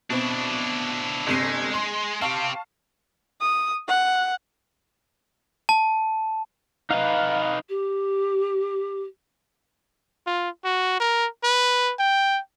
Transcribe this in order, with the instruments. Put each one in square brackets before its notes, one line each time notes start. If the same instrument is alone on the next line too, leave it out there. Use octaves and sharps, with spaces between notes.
[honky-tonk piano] B2 C4 [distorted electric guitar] D4 E4
[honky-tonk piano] G1 C3 C7 [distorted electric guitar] G#3
[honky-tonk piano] C6
[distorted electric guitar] C4 G4 [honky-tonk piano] F5 A5 C#6
[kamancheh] D#6
F#5
[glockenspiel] A5
[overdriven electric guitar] D#4 B4 [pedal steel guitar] F5
[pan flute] G4
[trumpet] F4
F#4
A#4
B4
G5